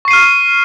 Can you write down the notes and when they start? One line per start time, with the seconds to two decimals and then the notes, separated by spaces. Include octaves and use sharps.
0.05 C#6
0.08 C7
0.11 D#7
0.13 F6